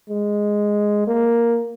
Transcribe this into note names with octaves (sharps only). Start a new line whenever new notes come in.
G#3
A#3